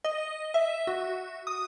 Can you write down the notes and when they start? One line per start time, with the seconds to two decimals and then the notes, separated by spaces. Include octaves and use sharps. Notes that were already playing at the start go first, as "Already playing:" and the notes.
0.04 D#5
0.54 E5
0.87 F#4
1.47 D#6